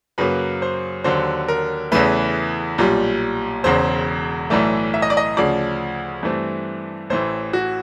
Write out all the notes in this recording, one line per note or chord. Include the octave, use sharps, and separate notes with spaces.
F#2 C#3 F#3 A#3 B4
C5
D#2 D3 F#3 C5
A#4
E2 C#3 E3 A3 B4
B1 A#2 G3
E1 E2 C#3 C5
B1 A2 E3 A3 D5
E5
D#5
D5
D#5
D2 C#3 F3 D5
G2 E3 A3 C4
A1 A2 E3 A3 C5
F#4